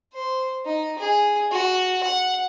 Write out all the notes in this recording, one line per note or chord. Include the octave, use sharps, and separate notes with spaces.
C5
D#4
G#4
F#4
F#5